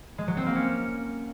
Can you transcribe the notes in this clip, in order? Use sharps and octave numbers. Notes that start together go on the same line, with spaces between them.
G#3
F#3
C4
A#3
C#4